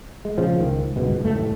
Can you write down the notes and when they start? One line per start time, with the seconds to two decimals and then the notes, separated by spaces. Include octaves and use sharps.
0.25 G#3
0.38 A#2 C#3 F3
0.60 C#2 D#3
0.96 G1 C#2 G#2 B2
1.21 F#1 A3
1.35 D#2 A2